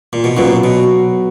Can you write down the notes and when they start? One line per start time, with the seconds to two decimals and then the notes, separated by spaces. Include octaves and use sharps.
0.13 A#2
0.24 B2
0.37 A#2 C#3 F#3 B3 F#4
0.64 B2